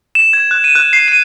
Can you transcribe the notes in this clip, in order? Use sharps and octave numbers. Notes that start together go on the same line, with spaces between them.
E7
G#6
F#6
D#7
F#6
C7
D#7